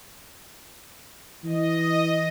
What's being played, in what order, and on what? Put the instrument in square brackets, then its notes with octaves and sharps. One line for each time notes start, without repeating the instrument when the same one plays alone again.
[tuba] E3 [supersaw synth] D#5